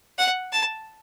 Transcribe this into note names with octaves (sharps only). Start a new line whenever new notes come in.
F#5
A5